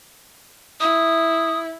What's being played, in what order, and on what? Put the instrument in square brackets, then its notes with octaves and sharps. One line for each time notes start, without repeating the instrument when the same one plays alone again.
[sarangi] E4 [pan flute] D#6